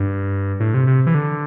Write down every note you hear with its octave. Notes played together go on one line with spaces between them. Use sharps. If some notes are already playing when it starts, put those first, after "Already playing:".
Already playing: G2
A2
C3
C3
E3
D3